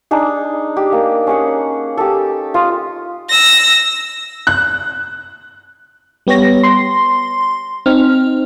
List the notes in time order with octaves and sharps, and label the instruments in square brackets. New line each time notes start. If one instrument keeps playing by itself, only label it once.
[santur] D4 D#4 G#4
G4
A#3
C#4 G#4 F#5
G4 A4
F4 D#6
[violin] E6 A#6
[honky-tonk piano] F#6
[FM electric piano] G3 B3 G4 C#5 A#6
C6
C4 D#4 F6